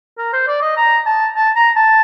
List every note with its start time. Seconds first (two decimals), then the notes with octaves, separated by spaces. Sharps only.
0.18 A#4
0.33 C5
0.47 D5
0.62 D#5
0.77 A#5
1.06 A5
1.36 A5
1.56 A#5
1.77 A5